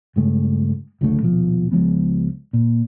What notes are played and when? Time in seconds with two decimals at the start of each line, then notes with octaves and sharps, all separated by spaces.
0.16 G2 C#3 G#3 A3
1.01 C#2 F#2 D3 A3
1.20 D#1 B2 F3
1.71 C#2 F3 G#3 B3
2.53 A#2